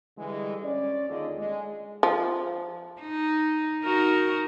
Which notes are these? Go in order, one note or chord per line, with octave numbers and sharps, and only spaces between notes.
D3 E3 G3 G#3
C#4 D5
D#2 D3 F4 G#4 D5 D#5
G#3
F3
D#4
D#4 F#4 A#4